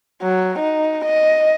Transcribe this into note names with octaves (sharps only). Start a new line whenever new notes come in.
F#3
D#4
D#5